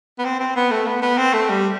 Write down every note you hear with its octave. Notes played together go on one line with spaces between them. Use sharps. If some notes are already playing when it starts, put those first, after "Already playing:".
B3
C4
C4
B3
A3
B3
B3
C4
A3
G3